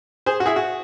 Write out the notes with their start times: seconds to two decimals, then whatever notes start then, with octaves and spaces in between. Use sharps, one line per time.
0.26 G#4 C5
0.40 F#4
0.46 E4 G#4
0.56 F#4